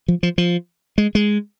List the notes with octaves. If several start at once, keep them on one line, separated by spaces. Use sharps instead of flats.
F3
F3
F3
G#3
G#3